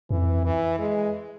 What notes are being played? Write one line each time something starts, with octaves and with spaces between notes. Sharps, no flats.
F2 E3
E3
G#3